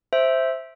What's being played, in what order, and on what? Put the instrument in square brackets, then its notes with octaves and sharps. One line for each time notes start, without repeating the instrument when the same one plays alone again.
[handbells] C5 E5